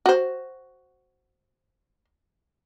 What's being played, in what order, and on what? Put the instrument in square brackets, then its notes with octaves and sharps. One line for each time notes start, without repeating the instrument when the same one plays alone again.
[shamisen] F#4 C5